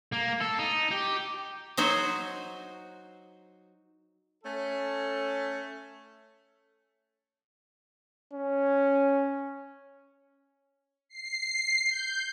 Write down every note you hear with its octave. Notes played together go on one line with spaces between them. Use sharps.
A#3
A4
D#4
G4
F#3 D#4 F#4 C5
A3 C#4 A4
C#4
C7
G6